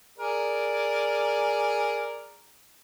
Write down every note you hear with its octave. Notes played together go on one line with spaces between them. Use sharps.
G#4 A#4 D5